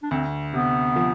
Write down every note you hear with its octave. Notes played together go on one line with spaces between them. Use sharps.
D4
D2 C4
C3 B3
F3